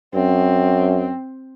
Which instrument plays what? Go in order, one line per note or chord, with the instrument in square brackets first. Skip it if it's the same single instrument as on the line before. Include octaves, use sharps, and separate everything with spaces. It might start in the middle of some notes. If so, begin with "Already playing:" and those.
[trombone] F#2 [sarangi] C4